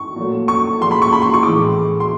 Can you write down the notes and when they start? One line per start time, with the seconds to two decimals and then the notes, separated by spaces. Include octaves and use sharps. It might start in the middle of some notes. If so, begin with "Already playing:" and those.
Already playing: C#6
0.16 A#2 F#3 A3
0.48 C#6
0.80 A#2 F3 G#3 C6
0.91 B5
1.02 C#6
1.13 B5
1.22 C6
1.34 C#6
1.43 A2 E3 G#3 D6
2.00 C6